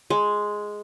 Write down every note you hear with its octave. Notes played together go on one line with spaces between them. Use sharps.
G#3